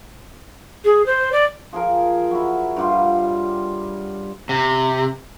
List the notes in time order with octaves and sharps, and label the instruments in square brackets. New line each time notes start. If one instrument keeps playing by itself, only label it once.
[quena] G#4
C5
D5
[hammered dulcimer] F3 G#4 A#4
F#3 E4
G2 G3 F4
[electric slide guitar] C3